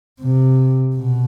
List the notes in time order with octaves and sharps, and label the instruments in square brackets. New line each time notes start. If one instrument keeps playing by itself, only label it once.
[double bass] C3
B2